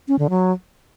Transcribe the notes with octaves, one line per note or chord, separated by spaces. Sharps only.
C#4
D3
F#3